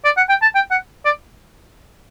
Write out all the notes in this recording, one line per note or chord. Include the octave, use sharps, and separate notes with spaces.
D5
F#5
G5
A5
G5
F#5
D5